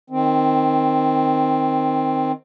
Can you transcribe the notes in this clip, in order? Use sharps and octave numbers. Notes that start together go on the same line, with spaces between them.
D#3 C4